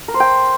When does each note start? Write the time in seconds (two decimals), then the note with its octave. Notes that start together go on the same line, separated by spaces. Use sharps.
0.08 A#4
0.14 C5
0.20 G5